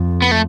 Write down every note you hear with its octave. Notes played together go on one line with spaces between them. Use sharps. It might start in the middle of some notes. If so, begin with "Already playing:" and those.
Already playing: F2
B3
A3